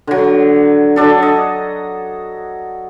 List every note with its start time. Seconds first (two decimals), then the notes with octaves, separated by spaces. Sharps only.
0.07 D3 F#3
0.96 F#3 D4 A4
1.22 D#5